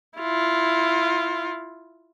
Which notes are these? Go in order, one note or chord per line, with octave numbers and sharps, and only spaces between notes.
E4 F4